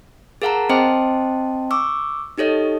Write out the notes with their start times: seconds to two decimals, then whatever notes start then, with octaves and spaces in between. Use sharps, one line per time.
0.42 G#4 A#4 F5 F#5 A5 A#5
0.69 C4 C5 D#5 G5 A5 C6
1.71 C#6 D6 E6
2.38 D#4 G4 A4 C#5 D#5